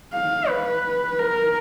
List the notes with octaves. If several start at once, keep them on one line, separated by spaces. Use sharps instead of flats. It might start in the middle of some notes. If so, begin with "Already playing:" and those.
F5
B4
A#4